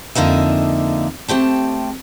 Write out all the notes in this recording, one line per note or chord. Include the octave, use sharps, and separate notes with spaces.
F2 D3 A#3 D#4 E5
A3 C4 G4 A5